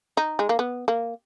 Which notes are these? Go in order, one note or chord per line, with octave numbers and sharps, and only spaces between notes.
D#4
G#3
A#3
B3
A#3